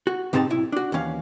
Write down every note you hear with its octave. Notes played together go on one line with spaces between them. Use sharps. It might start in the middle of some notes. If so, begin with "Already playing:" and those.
F#4
G#2 C3 C4 D#4 D#5 A5
B1 E4
D4 F#4
D#2 E3 C#4 F5